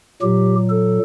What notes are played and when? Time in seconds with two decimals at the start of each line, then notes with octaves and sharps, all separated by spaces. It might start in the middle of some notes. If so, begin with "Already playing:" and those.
0.22 A#2 F#3 G4
0.70 A4